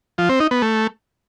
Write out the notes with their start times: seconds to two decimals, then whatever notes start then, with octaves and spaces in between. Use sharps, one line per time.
0.18 F3
0.29 C4
0.40 D#4
0.51 B3
0.62 A3